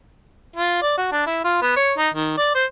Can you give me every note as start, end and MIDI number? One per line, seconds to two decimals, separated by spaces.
0.56 0.79 65
0.82 0.96 74
0.98 1.11 66
1.12 1.25 62
1.26 1.41 64
1.44 1.59 65
1.62 1.76 59
1.76 1.93 73
1.98 2.09 63
2.14 2.36 51
2.37 2.51 74
2.55 2.65 72